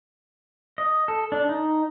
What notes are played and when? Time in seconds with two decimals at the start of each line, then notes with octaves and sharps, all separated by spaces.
0.78 D#5
1.08 A4
1.32 D4
1.49 D#4